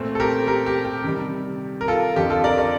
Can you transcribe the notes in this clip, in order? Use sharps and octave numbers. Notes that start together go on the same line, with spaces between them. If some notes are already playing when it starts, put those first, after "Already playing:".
Already playing: A#2 A3 C4
A4
G4 A#4
G4 A#4
G4
G4
C3 D#3 G3
A#4
F4 A4
F2 D3 F3 G4
F4 A4
A#4 D5
A#4 D5